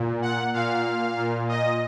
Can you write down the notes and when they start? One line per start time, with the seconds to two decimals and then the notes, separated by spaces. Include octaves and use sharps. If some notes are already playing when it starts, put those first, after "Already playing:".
Already playing: A#2
0.22 F#5
0.54 A#2 F5
1.17 A#2
1.49 D#5